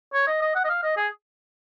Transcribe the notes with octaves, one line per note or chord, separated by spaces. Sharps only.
C#5
D#5
D#5
F#5
D#5
F5
D#5
G#4